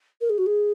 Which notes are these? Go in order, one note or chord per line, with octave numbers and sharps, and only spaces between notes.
A#4
G#4
F#4
G#4